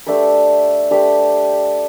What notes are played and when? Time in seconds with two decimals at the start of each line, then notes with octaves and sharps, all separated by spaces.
0.06 A3 D4 G4 B4
0.90 A3 D4 G4 B4